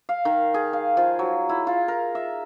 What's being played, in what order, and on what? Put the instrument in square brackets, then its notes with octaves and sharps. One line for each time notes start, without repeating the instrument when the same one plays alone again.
[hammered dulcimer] F5
D#3
G#4
F5
F3
F#3
E4
F4
A#4
E5